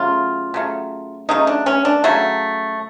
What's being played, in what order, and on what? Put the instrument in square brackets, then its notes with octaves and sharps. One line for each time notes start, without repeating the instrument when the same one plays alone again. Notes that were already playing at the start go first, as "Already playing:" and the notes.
Already playing: [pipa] C#3 F#3 A3 F4
C#3 F#3 A3
C#3 F#3 A3 D#4
D4
C#4
D4
C#3 F#3 A3